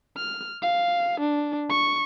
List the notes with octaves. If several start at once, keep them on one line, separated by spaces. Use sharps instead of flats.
F6
F5
D4
C#6